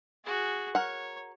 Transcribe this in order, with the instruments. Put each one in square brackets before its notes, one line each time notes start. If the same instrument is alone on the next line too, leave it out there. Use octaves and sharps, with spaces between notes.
[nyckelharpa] F#4 G#4
[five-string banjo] A#4 F#5 [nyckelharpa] C#5